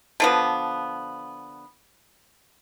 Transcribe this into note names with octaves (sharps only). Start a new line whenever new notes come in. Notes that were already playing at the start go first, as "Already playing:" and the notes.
D3 F3 B3